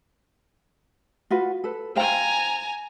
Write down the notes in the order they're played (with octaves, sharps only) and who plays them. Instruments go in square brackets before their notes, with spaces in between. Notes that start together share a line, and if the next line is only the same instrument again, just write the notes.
[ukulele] F4 F#4 B4
A4 B4
[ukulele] C5 F5 G5 [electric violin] G#5 A#5